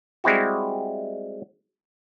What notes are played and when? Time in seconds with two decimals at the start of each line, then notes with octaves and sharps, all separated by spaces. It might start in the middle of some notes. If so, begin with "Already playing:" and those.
0.24 G3 G#3 C4 E4 F#4